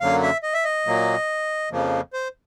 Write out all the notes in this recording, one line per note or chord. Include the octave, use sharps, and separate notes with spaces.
F#2 D3 F#3 A#3 F5
E5
D#5
E5
D#5
A#2 F#3 A#3
F2 C#3 F3 A#3
C5